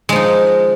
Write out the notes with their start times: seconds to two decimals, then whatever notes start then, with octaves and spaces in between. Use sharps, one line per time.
0.09 G#3
0.12 F3
0.16 D#4